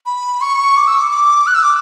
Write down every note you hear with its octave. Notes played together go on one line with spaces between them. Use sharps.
B5
C#6
D6
E6
D6
D6
F#6
E6
D6